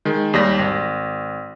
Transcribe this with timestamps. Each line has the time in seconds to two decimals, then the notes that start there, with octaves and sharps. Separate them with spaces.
0.05 D#3 G#3
0.34 D#2 G3 A#6
0.59 G#1